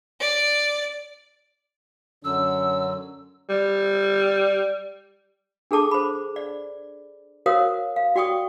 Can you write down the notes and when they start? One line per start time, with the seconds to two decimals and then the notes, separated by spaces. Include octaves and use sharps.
0.20 D5
2.24 F#2 D3 F#3 C#4 E6
3.50 G3
5.71 D4 G#4 A4 A5 D6
5.91 C5 B5
6.36 D5
7.46 F#4 A#4 C5 C#5 F5 D#6
7.96 F5
8.16 F#4 D5 G5 C#6 D#6